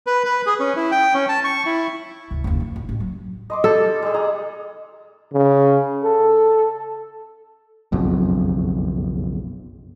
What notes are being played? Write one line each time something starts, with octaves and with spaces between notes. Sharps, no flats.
B4
B4
G#4
C#4
E4
G5
C#4
A5
C#6
E4
D2 C3
F#1 D#2
F3
A#1 F2
A1
F#3
D#5 C6 D6
G3 A4
G3 G#4
G#3 G#4 A#5
C#3
A4
F#1 B1 F2